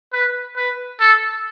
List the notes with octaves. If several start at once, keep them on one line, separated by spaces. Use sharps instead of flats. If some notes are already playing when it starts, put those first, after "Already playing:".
B4
B4
A4